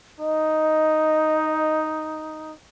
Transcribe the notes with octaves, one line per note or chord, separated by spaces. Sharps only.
D#4 D#5